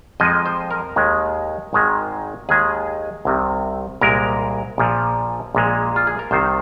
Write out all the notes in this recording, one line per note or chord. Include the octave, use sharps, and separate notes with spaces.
F2 F3 G#3 D#5
C5
A#4
D#2 D#3 G#3
G#1 G#2 D#3 G#3
D#2 D#3 G#3 G#4
C2 C3 D#3
C2 A#2 G#3 A#4
A#1 A#2 F3
A#1 A#2 G#3
F4
G#4
A#4
C2 C3 D#3 C5